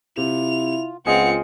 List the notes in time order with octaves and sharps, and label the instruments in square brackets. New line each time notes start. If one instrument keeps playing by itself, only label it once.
[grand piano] C3 [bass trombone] E4 [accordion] F4 [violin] F7
[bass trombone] C#2 [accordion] B3 [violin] C4 C#7 [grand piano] F4 G#4 D#5